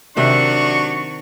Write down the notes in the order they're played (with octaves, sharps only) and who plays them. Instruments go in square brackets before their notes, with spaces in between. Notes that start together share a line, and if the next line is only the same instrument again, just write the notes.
[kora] C3 D#3 G4 [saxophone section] F#3 D4 [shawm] C#6